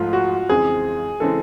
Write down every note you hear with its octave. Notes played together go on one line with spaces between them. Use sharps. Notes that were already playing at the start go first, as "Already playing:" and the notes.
Already playing: G#2 F3 A3 F4
F#4
F2 C#3 E3 G#3 C4 G#4
C#3 E3 G#3 C4 A4